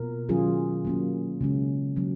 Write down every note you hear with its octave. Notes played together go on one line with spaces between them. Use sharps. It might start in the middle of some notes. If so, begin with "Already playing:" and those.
Already playing: B2 A#3 F4 A#4
D#3 F#3 C#4 F4 G#4
F#3 A#3 C#4
C#3 G#3 C#4
F#3 A#3 C#4